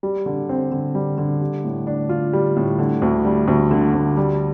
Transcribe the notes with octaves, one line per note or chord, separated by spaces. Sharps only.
G3
D3
C4
D3
G3
D3
G3
A2
D4
F4
G3
A2
D3
D2
G3
D2
D3
D2
G3